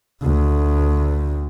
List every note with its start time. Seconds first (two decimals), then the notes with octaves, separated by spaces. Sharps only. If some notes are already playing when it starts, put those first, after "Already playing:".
0.23 D2